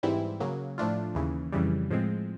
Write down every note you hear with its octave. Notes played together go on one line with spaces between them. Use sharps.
G#2 E3 G3 C4 E4
C#3 F#3 A#3
A2 F3 A3 D4 F4
D#2 C#3 E3
F2 C#3 E3 G3
A2 F3 G#3 C4